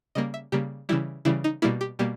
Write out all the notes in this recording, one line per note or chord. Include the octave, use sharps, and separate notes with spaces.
C#3 G3 A#3 D#5
E5
C#3 G3 A#3 G4
C#3 E3 G3 E4
C#3 E3 G3 E4
D#4
B2 G3 A#3 E4
G4
B2 G3 A#3 G4